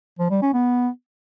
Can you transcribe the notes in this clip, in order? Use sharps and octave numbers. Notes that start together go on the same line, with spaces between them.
F3
G3
C#4
B3